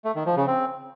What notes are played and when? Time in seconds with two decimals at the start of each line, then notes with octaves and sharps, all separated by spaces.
0.05 A3
0.15 D#3
0.26 F3
0.37 C#3
0.47 C4